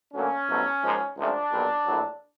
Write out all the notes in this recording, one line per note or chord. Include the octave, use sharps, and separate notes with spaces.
D2 D3 F#3 A#3 C#4
C2 B2 F#3 A3
G#2 F3 A#3
C#2 C3 F3 A3 D4
B1 A#2 G3
A#1 A2 F#3